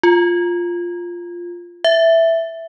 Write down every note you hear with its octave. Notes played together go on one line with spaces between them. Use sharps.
F4
E5